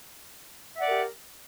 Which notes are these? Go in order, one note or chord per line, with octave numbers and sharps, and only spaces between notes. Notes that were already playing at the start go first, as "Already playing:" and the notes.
G4 A#4 D5 E5 F#5